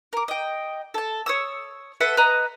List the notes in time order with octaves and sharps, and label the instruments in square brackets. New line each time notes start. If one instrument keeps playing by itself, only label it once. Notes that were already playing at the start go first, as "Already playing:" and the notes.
[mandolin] A#4 D6
D#5 G5
A4 A5
C#5 D#6 E6
A4 B4 E5 F#5
B4 D#5 A#5